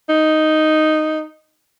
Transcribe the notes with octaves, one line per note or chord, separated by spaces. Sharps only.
D#4